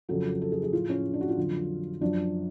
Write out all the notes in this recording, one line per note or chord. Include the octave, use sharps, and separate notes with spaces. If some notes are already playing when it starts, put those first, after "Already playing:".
F2 C#3 F#3 A4
A4
G#4
G#4
A2 F3 F4
C#4
D4
F#4
F4
F2 D3 F#3
F#2 F3 D4